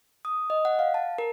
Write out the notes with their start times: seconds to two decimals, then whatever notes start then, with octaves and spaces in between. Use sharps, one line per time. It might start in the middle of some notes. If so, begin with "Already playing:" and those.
0.25 D#6
0.50 D#5
0.65 F#5
0.79 F5
0.94 A5
1.18 A#4